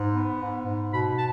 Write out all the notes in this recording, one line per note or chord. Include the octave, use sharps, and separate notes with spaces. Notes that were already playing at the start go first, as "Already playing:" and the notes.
Already playing: G#2
B3
G#2
G#2
B2 B5
A5